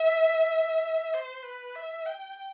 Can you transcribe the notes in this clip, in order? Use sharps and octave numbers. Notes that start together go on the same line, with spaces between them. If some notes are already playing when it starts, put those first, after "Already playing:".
Already playing: E5
C5
B4
E5
G5